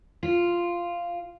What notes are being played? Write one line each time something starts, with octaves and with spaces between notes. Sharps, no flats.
F4